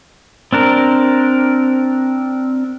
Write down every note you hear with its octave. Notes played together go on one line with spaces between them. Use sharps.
C4 D4 A#4